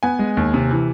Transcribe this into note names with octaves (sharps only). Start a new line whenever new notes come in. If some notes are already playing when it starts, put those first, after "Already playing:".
B3 G#5
G#3
D#2
C3
E3